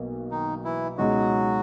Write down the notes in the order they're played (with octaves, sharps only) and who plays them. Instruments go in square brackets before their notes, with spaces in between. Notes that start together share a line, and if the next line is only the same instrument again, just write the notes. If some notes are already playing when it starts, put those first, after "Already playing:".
Already playing: [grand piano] B1 B2 A#3
[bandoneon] D#3 D#4
E3 E4
[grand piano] C#2 B2 G#3 D#4 [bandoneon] F#3 F#4